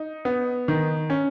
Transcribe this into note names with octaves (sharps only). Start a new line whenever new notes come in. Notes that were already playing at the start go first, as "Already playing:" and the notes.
Already playing: D#4
B3
D#3
C#4